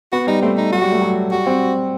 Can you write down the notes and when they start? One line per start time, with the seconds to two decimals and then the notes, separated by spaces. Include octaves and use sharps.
0.12 B3 F#4
0.27 G3 D#4
0.42 A3 C4
0.57 D#4
0.72 F#3 F#4
0.82 G3
0.92 A3
1.01 F#3
1.31 G3 F#4
1.47 C4